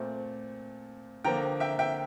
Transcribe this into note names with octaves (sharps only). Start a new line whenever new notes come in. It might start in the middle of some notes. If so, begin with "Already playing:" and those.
Already playing: A#2 A3 C4
D3 F3 A#3 G5 A#5
E5 G5
E5 G5